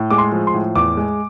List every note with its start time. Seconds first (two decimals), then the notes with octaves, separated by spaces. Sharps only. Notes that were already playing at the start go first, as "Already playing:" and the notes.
Already playing: A2
0.10 G#3 D6
0.18 C6
0.32 F3
0.47 C6
0.54 A2
0.75 E2 D6
0.97 G#3